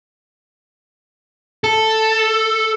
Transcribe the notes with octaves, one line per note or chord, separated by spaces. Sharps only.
A4